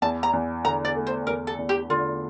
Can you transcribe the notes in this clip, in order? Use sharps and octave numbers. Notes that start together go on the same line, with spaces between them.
E2 A5
A#5
E2
D3 A#5
D5
A3
C5
E2 A#4
A4
E2
G4
D3 F4